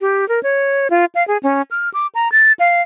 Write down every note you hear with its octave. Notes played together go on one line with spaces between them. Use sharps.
G4
A#4
C#5
F4
F5
G#4
C#4
F6
D6
A#5
A6
F5